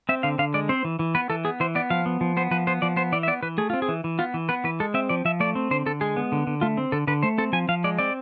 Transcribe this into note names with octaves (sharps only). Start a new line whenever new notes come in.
C4 E5
D3 F5
D3 F5
G#3 D5
C4 C5
E3
E3
B3 B4
E3 A4
B3 G#4
E3 C5
B3 D5
F3 F5
B3
F3
B3 C5
F3 B4
B3 C5
F3 D5
B3 C5
E3 D5
E5
B3 D5
E3 B4
A3 G#4
C4 F4
G#4
E3
E3
B3 F4
E3
B3 B4
E3 B4
G#3 A4
C4 E5
F3 D5
F3 E5
A3 D5
C4
D3 C5
D3 A4
G#3 G#4
B3
D3
D3
A3 F4
C4
D3 A4
D3 B4
A3 C5
C4 A4
F3 G#5
F3 F5
G#3 D5
C4 D5